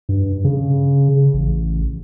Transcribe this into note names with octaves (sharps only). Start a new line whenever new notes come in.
G2
C#3
A1